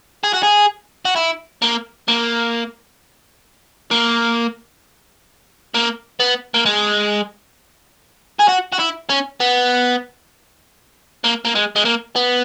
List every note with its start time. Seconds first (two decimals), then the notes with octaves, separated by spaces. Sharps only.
0.24 G#4
0.34 F#4
0.43 G#4
1.05 F#4
1.16 E4
1.62 A#3
2.08 A#3
3.91 A#3
5.74 A#3
6.20 B3
6.54 A#3
6.66 G#3
8.40 G#4
8.49 F#4
8.73 F#4
8.80 E4
9.10 C#4
9.40 B3
11.24 A#3
11.45 A#3
11.55 G#3
11.76 G#3
11.85 A#3
12.16 B3